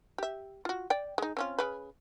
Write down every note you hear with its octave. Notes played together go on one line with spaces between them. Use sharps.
G4 E5
F4 F#4
D5 G5
G#3 D#4
C4 C#4 F4
C#3 B4